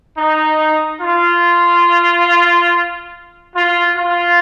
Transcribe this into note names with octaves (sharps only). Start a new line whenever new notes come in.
D#4
F4
F4
F4